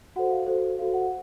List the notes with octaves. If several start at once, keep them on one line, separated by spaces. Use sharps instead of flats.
F#4 A4 C5 F#5
F5
F#4 A4 C5
F#4 A4 C5 F5
F#5